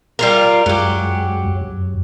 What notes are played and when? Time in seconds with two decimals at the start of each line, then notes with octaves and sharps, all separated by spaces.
0.19 G3 F4 A#4
0.66 F#2 F#3 G#3 G4
1.61 F#2